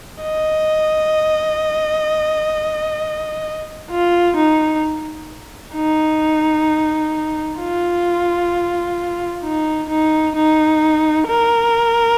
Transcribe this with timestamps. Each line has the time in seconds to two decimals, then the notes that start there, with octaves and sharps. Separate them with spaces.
0.22 D#5
3.91 F4
4.37 D#4
5.76 D#4
7.60 F4
9.44 D#4
9.90 D#4
10.36 D#4
11.28 A#4